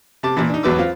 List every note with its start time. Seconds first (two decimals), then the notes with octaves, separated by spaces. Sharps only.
0.23 C3 A5 D6
0.37 A#2 E3
0.50 D4 D#4
0.63 G#1 E2 F#3 B4 D6 E6
0.78 C4 F4